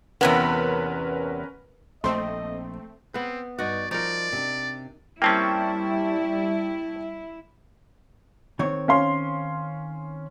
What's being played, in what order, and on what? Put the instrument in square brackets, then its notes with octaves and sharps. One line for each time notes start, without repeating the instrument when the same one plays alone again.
[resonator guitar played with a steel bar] E2 C3 B3 [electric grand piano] C#4 A#4 B4
[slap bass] A#1 [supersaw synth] A3 C4 [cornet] D#5 [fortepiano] C6
[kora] B3 B4 [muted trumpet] C4
[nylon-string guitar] G2 D#4 [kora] F#4 [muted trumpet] D5
[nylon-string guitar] F3 [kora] D#4 A#4 [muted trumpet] D5
[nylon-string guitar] C3 D4
[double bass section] G3 [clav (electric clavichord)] A#3 C4 C#4 [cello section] E4 [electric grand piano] G5 A5 C#6
[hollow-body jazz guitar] D#3 C4 C#5
[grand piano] C#4 F5 C6